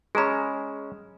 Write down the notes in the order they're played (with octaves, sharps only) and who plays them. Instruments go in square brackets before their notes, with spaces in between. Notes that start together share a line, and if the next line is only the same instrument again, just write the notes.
[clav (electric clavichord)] G#3 C#4 [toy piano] G#4 A#5 B5